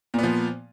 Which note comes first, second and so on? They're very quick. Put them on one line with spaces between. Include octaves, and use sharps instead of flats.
A#2 B3 F3